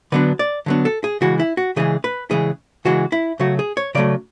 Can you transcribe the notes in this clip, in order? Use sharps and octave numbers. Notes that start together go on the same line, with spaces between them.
D3 F#3 B3 D4 B4
D5
D3 F#3 B3 D4
A4
G#4
C#3 E3 G#3 F#4
E4
F#4
C#3 E3 G#3 G#4
B4
C#3 E3 G#3 G#4
C#3 E3 G#3 F#4
E4
C#3 F#3 A3 F#4
G#4
C#5
C#3 F#3 A3 D5